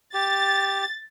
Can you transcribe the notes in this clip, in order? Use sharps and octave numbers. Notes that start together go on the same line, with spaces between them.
G4 A6